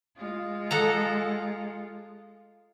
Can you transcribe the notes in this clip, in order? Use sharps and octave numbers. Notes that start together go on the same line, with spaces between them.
G#3 F4
A4 F#5 A#5